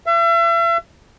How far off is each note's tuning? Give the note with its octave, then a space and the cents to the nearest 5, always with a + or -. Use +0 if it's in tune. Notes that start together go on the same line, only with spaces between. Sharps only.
E5 +40